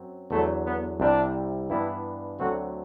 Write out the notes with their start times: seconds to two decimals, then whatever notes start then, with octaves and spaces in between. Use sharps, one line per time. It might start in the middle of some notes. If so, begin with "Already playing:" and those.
Already playing: F#2 F#3 C4 F#4
0.31 E2 D3 F#3 A3
0.66 B3
1.00 C2 C3 G3 C4 D4 G4
1.70 G2 E3 G3 B3 D4 E4
2.40 D2 D3 F#3 A3 C4 F#4